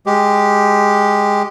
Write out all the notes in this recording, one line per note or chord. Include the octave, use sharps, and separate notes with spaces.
G#3 G4